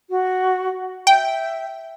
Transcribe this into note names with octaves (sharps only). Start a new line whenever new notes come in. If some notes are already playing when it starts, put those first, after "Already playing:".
F#4
E5 G5